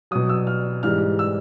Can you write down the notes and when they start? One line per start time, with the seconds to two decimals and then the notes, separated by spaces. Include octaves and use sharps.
0.11 B2 F#3 D#6
0.29 E6
0.47 F6
0.83 G#2 E3 G3 F6
1.19 E6